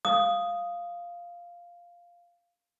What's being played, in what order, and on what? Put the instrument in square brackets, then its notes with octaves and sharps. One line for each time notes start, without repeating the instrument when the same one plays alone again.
[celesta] F5 [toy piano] D#6